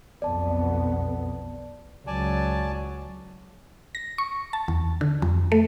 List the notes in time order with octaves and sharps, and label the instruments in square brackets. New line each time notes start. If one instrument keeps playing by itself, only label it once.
[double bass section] B1 F2 B3 [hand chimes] D5 A5
[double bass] C#2 F#3 [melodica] D5 G#5 A5
[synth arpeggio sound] A#6
C#6
A5
E2
D3
F2
A3